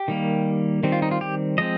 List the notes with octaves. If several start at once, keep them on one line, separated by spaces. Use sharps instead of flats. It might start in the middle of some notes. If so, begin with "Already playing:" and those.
Already playing: G4
D#3 G3 A#3
D#3 G3 C4
F4
D#4
F4
G4
F3 G#3 C4 D#5